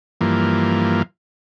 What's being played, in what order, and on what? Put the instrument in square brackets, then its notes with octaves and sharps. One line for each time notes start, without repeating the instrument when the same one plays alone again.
[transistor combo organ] G2 E3 F3 A#3